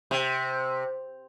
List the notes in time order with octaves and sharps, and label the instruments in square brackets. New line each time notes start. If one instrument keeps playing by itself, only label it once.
[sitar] C3